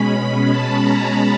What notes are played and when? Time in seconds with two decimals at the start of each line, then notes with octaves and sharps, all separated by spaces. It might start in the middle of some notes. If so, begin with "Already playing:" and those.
Already playing: B2 G#3 C#4 B5
0.52 A5
0.83 A#5